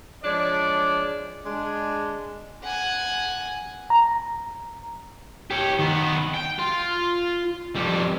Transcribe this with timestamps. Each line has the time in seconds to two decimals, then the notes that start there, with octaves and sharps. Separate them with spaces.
0.23 F3 G#3 D4 C#5 D5
1.46 G#3 D4
2.64 F#5 G#5
3.90 A#5
5.51 G4 C#5
5.79 D#3 B3
6.35 G5
6.59 F4
7.76 F2 G3